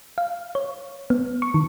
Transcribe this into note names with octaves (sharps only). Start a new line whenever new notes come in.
F5
C#5
B3
C#6
D#3